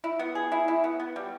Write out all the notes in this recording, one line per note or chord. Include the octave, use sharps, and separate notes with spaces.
E4
B3
G#4
E4
E4
B3
B3
G3